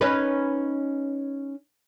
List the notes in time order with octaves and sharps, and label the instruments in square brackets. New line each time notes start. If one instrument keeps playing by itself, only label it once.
[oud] C#4 D#4 B4